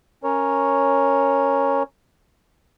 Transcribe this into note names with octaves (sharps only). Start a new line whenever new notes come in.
C#4 A#4 C#5